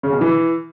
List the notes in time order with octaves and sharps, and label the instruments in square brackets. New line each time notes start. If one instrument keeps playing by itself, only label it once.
[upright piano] C#3
B2
E3